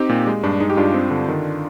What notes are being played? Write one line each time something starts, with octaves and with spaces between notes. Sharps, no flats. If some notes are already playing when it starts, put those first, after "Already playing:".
Already playing: C4 D#4 G4
A#2
G#3
G2 D4
G#3 D#4
G4
G2 D4 F4
C4
D3
D#3